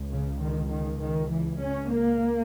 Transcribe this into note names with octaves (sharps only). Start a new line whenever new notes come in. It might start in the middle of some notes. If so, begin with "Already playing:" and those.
Already playing: C#2
C#3
D#3
D#3
D#3
E3
C#4
A#3